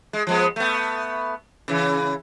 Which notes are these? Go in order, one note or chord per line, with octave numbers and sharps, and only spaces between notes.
G#3
F3 G#3 B3
A3 B3
C#3 E3